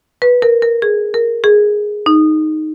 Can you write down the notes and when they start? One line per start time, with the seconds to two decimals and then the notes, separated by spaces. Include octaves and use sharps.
0.22 B4
0.42 A#4
0.62 A#4
0.82 G#4
1.14 A#4
1.44 G#4
2.06 D#4